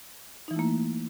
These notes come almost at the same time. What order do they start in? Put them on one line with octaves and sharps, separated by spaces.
D#4 E3 E4 A3 A#3